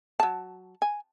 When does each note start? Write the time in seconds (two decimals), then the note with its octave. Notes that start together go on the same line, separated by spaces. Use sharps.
0.20 F#3 A5
0.82 G#5